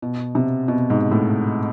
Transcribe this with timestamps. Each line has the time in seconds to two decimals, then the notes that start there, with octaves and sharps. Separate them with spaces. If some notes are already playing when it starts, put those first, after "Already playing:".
0.02 B2
0.35 C3
0.68 B2
0.90 G#2
1.12 A2